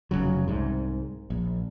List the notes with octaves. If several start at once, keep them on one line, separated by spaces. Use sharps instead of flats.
F1 D2 C#3 F#3
C2 G#2
A#1